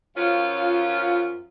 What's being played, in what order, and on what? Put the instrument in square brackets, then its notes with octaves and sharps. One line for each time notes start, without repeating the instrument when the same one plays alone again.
[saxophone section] F#2 F3 C#4 F4